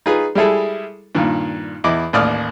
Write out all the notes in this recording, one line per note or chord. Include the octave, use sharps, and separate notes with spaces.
D#4 F4 G#4 B4
G3 G#3 E4 G#4 A4
G2 A#2 D#3
E2 E4 D#5 D6
A1 D#2 D5 D#6 F6